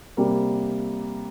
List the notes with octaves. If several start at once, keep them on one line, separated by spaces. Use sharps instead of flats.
C3 G3 A#3